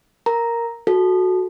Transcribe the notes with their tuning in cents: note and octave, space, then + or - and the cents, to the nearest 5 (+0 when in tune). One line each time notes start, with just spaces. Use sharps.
A#4 +0 A#5 +0
F#4 -5 A4 -20